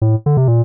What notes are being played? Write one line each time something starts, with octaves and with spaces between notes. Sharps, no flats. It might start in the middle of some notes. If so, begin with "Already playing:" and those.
A2
D3
C3
A#2